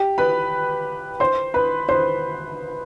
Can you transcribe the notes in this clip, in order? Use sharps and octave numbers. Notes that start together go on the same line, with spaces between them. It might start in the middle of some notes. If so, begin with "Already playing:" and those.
Already playing: G4
B4 B5
C5 C6
B4 B5
C5 C6